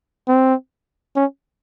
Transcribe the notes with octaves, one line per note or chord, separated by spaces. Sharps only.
C4
C#4